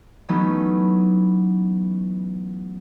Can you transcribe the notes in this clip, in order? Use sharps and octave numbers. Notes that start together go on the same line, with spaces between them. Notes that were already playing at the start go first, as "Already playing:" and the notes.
E3 F#3 A3 B3 C#4 D#4